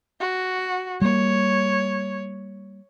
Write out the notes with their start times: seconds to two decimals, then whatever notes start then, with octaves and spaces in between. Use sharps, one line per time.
0.20 F#4
1.02 G3 A#3 C#5